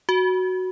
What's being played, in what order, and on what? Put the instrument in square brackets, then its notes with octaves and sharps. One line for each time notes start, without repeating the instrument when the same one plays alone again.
[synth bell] F#4